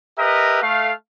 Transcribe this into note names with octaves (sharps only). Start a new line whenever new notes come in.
G4 A#4 B4 D#5 E5
A3 F5